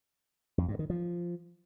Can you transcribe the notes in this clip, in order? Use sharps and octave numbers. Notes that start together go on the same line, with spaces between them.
F2
G2
D#3
F3